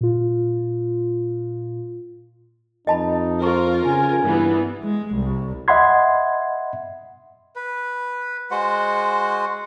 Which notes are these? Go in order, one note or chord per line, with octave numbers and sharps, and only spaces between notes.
A#2 F4
F2 D#4 D#5 A5 B5
F4 A#4 C5 A#5 C#6
C#3 G#5
G2 E3 B3
G#3
C2
D#5 E5 F#5 B5 C6 G#6
B4
G#3 F#4 C5 F#5